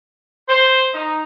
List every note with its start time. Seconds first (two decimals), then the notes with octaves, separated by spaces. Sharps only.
0.49 C5
0.94 D#4